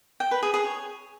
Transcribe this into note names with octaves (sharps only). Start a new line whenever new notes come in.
G5
B4
G#4
G#4
C#5